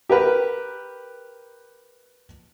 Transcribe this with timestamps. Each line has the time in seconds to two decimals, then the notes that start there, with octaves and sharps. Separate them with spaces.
0.09 G4 A#4 B4